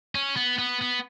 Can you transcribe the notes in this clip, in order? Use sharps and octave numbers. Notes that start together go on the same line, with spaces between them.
C#4
B3
B3
B3